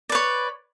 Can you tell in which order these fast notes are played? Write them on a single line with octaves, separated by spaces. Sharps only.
D5 B4 C#5